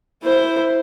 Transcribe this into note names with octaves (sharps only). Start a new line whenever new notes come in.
E4 C5